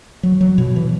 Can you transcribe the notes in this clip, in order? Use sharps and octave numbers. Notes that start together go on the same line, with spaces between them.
F#3
F#3
B2
E3